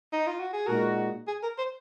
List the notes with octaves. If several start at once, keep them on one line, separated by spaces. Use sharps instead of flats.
D#4
F4
F#4
G#4
A#2 G#3 D#4 F#4 A#4
G#4
A#4
C5